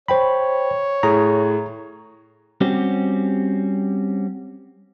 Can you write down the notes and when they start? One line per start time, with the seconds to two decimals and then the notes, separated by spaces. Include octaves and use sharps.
0.08 C5 C#5 G5 B5
1.03 A2 G#4 A#5
2.61 G3 C4 C#4 F#4 G4